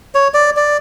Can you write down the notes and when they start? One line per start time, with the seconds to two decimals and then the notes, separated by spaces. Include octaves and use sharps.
0.15 C#5
0.34 D5
0.57 D5